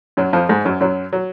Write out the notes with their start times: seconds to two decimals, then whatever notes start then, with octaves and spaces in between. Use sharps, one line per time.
0.17 F#2 F#3
0.33 F2 F3
0.49 G#2 G#3
0.65 F#2 F#3
0.80 F#2 F#3
1.13 F#3